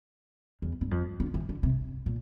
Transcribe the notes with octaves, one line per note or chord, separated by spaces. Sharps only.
E2
G2
F2
D3
E3
D3
C3
A#2